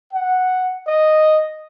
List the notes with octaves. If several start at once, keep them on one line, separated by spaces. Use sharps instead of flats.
F#5
D#5